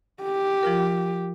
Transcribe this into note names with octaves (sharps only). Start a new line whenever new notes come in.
G4
F3 F4 A#4